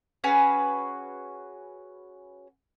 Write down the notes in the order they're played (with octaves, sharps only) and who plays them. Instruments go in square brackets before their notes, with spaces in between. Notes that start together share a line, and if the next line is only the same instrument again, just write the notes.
[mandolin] C#4 F#4 G#4 B4